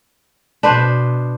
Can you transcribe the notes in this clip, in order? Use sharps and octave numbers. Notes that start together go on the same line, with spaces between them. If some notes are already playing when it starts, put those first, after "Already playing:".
B2 D4 B4 C5